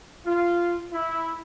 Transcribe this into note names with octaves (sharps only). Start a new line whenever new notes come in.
F4
E4